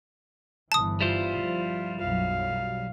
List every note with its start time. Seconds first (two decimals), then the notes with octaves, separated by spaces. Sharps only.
0.72 G1 E3 A5 D#6
1.01 G3 E4 F4 C5
1.37 F3
2.01 B1 F#2 F#3 F5